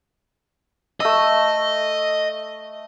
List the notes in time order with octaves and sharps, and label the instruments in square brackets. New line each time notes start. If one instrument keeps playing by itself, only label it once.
[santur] A3 E6 [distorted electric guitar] D#5